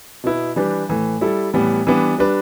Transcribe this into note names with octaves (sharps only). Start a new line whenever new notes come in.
B2 B3 E4 B4
E3 G3 D4 G4 B4
A2 E3 A3
G3 E4 A4
A2 E3 G3 B3
E3 G3 B3 D4
G3 D4 B4